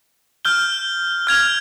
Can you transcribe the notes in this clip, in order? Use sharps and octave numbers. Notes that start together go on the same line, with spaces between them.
F6 G6 G7
F6 G#6 F7